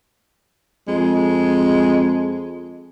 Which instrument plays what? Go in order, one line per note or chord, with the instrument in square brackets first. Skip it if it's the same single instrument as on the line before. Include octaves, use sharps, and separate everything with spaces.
[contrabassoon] F2 [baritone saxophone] G#3